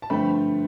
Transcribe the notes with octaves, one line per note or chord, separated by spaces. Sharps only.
A5
G2 D3 F3 A3 C4 G5 B5